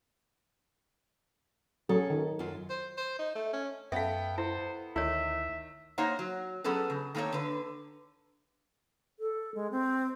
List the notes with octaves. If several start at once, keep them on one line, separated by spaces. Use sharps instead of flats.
F#3 C#4 G#4 A4
D#3
F#2 F4
C5
C5
D#4
A3
C#4
F#2 B3 A4 E5 F5 G5
E4 C5
D2 D#3 E4 C#5 E5
A#3 D#4 C5 C#5 F#5
F#3
F#3 B3 C#4 G#4 A4 B4
C#3
D#3 A3 A#3 C4 C#5
D3 B4
A4
G#3
C4